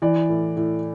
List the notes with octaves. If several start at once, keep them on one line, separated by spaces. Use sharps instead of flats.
E3 D5
A2
A2